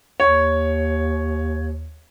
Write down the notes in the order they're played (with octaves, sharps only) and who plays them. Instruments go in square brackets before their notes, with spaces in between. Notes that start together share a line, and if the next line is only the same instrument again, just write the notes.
[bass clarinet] D#2 [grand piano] C#5